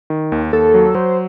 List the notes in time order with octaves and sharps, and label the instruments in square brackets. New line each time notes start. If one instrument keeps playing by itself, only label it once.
[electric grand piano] D#3
D#2
[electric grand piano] D#2 [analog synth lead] A4
[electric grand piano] F#3
[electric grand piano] F#3 [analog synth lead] C5